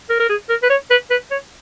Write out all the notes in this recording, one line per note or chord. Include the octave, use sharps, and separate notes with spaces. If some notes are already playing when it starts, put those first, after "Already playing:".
A#4
A#4
G#4
A#4
B4
C#5
B4
B4
C#5